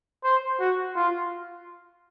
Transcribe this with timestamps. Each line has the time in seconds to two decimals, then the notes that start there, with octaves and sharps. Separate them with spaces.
0.24 C5
0.60 F#4
0.96 F4